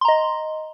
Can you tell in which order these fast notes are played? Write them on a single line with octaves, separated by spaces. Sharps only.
C6 A#5 D#5